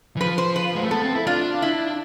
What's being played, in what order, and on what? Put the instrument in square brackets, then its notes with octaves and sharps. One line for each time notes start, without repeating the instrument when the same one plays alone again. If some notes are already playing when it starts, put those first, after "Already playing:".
[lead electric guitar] E3
[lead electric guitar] F3 [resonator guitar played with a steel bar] B4
[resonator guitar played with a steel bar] C5
B4
[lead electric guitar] G#3
A3
[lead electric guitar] B3 [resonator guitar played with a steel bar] A4
[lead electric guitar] C4
E4
[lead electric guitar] D4 [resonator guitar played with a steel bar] F4
[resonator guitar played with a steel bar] E4